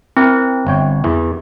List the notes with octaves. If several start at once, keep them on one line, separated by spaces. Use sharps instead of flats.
C4 E4 A#4
G1 C#5 G5
E2 E3